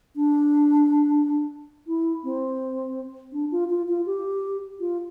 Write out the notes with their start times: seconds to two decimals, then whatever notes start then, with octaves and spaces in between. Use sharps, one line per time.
0.16 D4
1.87 E4
2.24 C4
3.33 D4
3.52 F4
3.70 F4
3.88 F4
4.06 G4
4.80 F4